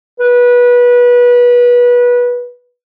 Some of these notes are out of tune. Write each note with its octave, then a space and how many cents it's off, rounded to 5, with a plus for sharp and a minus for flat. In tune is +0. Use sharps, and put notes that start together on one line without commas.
B4 -25